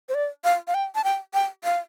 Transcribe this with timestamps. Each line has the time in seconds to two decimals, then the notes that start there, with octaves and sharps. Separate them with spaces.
0.09 C5
0.14 D5
0.44 F5
0.68 F5
0.74 G5
0.95 A5
1.04 G5
1.34 G5
1.64 F5